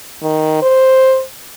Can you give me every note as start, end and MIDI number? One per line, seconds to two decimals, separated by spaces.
0.23 0.58 51
0.62 1.23 72